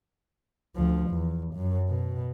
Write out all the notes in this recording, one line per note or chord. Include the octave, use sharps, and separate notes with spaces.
D2 F3
E2
F#2
B2